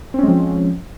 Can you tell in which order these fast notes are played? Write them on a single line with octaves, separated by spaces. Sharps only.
C4 C#4 G#3 F3